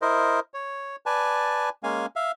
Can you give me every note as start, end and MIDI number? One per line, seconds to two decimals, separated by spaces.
0.02 0.40 64
0.02 0.40 70
0.02 0.40 72
0.02 0.40 75
0.54 0.96 73
1.06 1.69 71
1.06 1.69 74
1.06 1.69 80
1.06 1.69 81
1.83 2.06 56
1.83 2.06 58
1.83 2.06 61
1.83 2.06 77
1.83 2.06 80
2.16 2.32 76
2.16 2.32 77